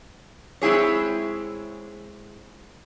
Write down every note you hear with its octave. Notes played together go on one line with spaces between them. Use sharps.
G#3 C4 E4 G#4 C#5